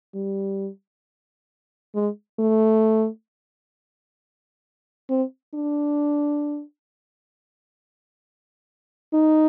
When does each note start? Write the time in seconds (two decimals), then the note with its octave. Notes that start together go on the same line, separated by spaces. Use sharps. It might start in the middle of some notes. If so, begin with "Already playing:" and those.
0.14 G3
1.94 G#3
2.39 A3
5.09 C4
5.54 D4
9.13 D#4